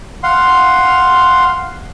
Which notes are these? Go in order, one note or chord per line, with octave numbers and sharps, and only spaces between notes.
F5 F#5 C6